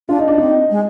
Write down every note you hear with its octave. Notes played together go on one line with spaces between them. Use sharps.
D4 F4
D#4
D4
C4 D#4
G#3